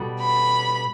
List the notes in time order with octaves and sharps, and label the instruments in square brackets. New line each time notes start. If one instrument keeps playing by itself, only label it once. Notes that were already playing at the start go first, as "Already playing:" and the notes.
Already playing: [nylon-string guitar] B2 G3 B3 F#4 A4
[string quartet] B5